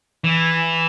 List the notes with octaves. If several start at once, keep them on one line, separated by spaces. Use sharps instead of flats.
E3